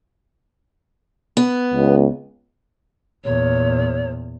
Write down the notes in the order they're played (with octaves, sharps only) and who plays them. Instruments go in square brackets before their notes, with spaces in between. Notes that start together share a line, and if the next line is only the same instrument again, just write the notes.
[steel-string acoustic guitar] B3
[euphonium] C#2
[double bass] E2 A#2 [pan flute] C#5